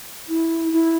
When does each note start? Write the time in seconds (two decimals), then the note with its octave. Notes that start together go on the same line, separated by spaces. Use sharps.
0.28 E4
0.72 E4